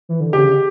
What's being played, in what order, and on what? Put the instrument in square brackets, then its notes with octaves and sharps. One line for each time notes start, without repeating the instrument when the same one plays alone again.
[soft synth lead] E3
D3
[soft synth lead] C#3 [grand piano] G4